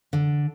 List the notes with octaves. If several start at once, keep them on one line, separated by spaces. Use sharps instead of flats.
D3